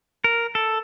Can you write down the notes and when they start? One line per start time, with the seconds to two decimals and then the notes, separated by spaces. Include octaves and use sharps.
0.24 A#4
0.55 A4